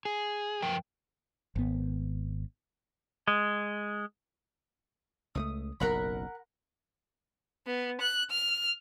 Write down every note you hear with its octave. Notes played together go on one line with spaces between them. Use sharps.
G#4
F#2 F3 A#4 G5
G#1 B3
G#3
C#2 G#3 A3 D#6
F#1 B1 A2 A#4 F#5 B5
B3
F#6
F6